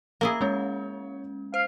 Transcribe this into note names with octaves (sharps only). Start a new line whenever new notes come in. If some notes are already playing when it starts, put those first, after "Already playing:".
A#3 E4 G#4 F5
G#3 C#4 C#5 G6
C5 F5